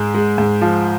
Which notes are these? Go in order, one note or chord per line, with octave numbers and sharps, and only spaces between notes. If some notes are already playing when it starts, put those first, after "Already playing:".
Already playing: G#2 G#3
G#3
G#2
F3